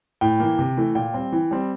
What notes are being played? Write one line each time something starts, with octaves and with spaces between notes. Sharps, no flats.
A2 G5
E3 A#3
C3
E3 A3
A#2 G5
G3 C4
E3
G3 C4